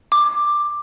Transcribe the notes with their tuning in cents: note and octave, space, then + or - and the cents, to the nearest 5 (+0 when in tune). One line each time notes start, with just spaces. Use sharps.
D6 +10